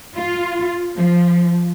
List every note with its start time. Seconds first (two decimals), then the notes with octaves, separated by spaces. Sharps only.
0.16 F4
0.97 F3